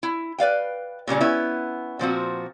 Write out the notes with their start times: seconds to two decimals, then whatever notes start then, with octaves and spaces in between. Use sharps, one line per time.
0.03 E4
0.38 B4 D5 F5 G5
1.07 A#2 C#3 G3 C#4
1.21 B3 C#4 E4
1.99 A#2 F3 C4 F#4